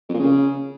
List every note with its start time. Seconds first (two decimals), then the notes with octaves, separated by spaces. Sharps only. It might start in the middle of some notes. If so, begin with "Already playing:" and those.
0.09 F2
0.14 A#2
0.19 C#3